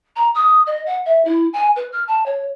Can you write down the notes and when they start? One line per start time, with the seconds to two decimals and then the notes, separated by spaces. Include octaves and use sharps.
0.16 A#5
0.35 D#6
0.67 D#5
0.86 F#5
1.06 E5
1.25 E4
1.53 G#5
1.76 B4
1.92 F6
2.08 A5
2.26 C#5